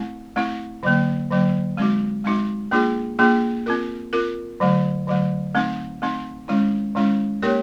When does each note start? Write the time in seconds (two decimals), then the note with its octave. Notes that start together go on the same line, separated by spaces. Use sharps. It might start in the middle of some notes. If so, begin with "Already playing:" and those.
Already playing: A3 C4 E4
0.36 A3 C4 E4
0.83 D3 F#3 A#3
1.31 D3 F#3 A#3
1.77 G#3 C4 D#4 F#4
2.24 G#3 C4 D#4 F#4
2.71 A#3 D4 F4 G#4
3.19 A#3 D4 F4 G#4
3.66 C4 F4 A#4
4.13 C4 F4 A#4
4.60 D3 F#3 A3
5.07 D3 F#3 A3
5.55 A3 C4 D#4
6.02 A3 C4 D#4
6.48 D#3 G#3 C#4 E4
6.95 D#3 G#3 C#4 E4
7.42 A#3 D#4 G4 A#4 C#5